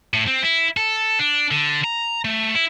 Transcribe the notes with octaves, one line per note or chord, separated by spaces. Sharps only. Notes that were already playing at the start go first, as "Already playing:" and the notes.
A2
C4
E4
A4
D4
D3
A#5
A3
E4